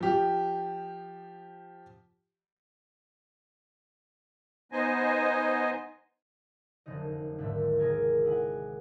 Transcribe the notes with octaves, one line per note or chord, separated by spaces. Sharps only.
F3 G4
B3 D#4 C5 D#5 G#5
F1 F#2 D3 D#4 D#5
G#1 D#2 D3 E5 G6
C3 C4 G#4 A#4 D#5 G#6
E4 D#5 F#5 G#5